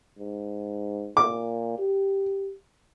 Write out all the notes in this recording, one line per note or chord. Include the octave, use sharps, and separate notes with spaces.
G#2
A#2 D6
G4